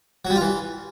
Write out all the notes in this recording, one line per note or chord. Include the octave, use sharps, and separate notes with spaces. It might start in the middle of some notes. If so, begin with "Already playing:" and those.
F#3
G3
F4
E3